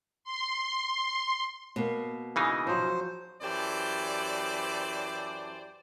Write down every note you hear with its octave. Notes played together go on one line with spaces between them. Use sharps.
C6
B2 A#3
C#3 E3 D#4 G#4
F3 F#3 C5
F#2 E3 G4 C5 D5 A5